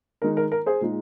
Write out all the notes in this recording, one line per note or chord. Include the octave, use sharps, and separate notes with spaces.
D#3 G#3 D#4 A#4
A#4
A#4
G#4 C5
A#2 G#3 D#4